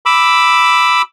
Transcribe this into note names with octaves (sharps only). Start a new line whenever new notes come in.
B5 D6 E6